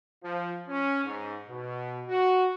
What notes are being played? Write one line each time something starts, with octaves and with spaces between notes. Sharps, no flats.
F3
C#4
G#2
B2
F#4